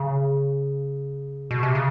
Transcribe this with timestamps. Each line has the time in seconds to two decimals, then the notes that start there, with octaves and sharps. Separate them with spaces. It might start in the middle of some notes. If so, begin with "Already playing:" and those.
Already playing: C#3
1.51 B2
1.63 C3
1.75 C#3